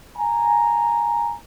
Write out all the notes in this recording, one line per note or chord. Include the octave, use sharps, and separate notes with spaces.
G#5 A#5